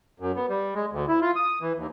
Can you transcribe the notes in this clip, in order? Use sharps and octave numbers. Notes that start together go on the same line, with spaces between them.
F#2
B3
G3
G#3
D2
E4
F4
D#6
E3
D#2